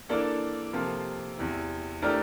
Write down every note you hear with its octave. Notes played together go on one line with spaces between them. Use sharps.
E3 A#3 D4 A4
C3 F3 A#3 F4 A4
E2 C3 E3
E3 A3 D4 G4 A#4